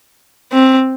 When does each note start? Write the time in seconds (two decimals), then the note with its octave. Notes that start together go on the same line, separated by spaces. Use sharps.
0.52 C4